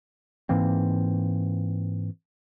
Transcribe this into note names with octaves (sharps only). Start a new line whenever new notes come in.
G#2 E3 A#3 C4